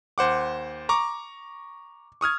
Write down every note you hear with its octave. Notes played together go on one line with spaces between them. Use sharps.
D#2 C5 F#5 D6
A#5 C#6 D6
C#6 D#6 F6 G#6